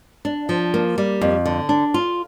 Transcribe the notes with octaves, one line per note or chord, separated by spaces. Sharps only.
D4
F3
A#3
G3
F2
D3
D4
F4